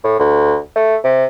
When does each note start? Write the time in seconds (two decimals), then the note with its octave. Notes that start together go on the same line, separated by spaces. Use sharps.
0.04 A2
0.19 D2
0.76 A3
1.04 C3